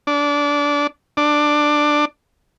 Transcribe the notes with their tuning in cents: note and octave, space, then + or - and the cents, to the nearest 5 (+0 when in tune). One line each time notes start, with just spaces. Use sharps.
D4 -20
D4 +10